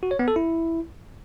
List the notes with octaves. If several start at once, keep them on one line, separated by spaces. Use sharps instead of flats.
F#4
C#5
B3
A4
E4